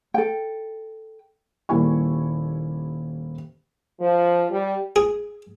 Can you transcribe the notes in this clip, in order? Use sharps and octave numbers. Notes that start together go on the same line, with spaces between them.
A4 G5
D#1 G3 A#3 E4 G#5 C#6
F3
G3
G#4